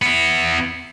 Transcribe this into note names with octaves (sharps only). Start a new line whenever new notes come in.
B3 E4